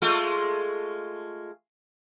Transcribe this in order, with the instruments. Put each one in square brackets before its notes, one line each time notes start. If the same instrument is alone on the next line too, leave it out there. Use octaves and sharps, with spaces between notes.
[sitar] G#3 A3 F4